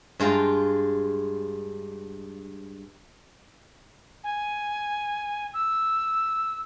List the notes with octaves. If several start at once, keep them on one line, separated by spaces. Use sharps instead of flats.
G2 G#3 F4 G5 A#5
G#5
E6